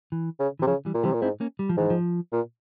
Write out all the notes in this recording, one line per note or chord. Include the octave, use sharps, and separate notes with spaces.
E3
C#3
E3
C3
C#3 F3
E3 G3
A#2
C3 E3 G3
A#2
G#2 C4 E4
A#3 C#4
G3
F3
G#2 E3
F3
A#2